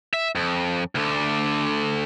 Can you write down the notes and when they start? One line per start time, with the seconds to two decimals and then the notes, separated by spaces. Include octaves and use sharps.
0.14 E5
0.35 F2
0.95 D2 D3